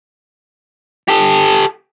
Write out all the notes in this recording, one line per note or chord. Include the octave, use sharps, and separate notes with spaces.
G4 A4